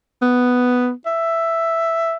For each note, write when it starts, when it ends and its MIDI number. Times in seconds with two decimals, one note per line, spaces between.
0.22 0.92 59
1.06 2.17 76